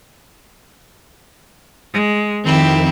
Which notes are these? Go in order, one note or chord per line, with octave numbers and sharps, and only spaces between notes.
G#3
F2 D#3 C4 E4 G4